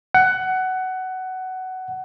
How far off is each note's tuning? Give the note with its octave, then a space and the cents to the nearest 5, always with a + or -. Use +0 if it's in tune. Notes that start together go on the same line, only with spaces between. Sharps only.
F#5 +15